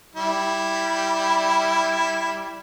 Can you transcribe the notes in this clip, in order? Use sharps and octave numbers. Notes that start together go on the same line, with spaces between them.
G3 E4